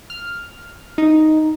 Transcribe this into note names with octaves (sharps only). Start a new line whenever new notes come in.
F6
D#4